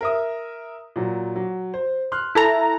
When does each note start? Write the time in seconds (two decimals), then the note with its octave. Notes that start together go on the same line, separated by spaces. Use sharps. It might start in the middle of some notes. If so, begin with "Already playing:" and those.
0.01 A#4 E5 D#6
0.96 A#2 F#3
1.36 F#3
1.74 C5
2.12 C6 F6 F#6
2.35 E4 A4 A5 A#5